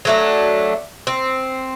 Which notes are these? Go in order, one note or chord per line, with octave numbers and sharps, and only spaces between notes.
F#3 A3 D4
C4